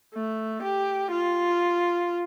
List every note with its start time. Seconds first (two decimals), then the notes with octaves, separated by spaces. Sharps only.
0.14 A3
0.63 G4
1.11 F4